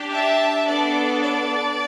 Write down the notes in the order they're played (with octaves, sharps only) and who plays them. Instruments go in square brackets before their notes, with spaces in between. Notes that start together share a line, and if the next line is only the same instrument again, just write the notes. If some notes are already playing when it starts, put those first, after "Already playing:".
Already playing: [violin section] D4 G4
E5 A5
B3 D4 A4 D5
D5